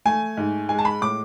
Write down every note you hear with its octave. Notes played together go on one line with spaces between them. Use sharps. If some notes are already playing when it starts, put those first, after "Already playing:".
A3 G#5
G#2
G#3 G#5
A5
B5
A2 D6